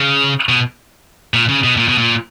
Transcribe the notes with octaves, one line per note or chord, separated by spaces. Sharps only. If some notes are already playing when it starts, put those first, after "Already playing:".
Already playing: C#3
B2
A#2
C#3
B2
A#2
B2
A#2